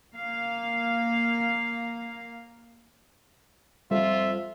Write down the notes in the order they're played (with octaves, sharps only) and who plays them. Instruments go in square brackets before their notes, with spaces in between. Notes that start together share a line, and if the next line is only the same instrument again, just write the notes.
[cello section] A#3 F5
[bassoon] F2 [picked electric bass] G3 [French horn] F4 [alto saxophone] E5